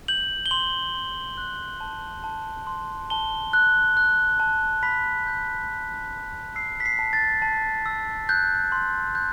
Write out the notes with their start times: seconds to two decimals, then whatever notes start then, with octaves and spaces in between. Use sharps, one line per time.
0.08 G6 F#7
0.46 G7
0.51 C6 F#7
0.95 C6
1.38 F#6
1.81 A5
2.24 A5
2.67 C6
3.10 A5 G7
3.53 F#6
3.97 F#6
4.40 A5
4.83 B5 B6
5.27 G6
5.70 B5
6.13 B5
6.55 E6 C7
6.80 B6
6.85 C7
6.99 A5
7.13 A6
7.42 A5
7.86 E6
8.29 F#6 G6
8.72 C6
9.15 F#6 G6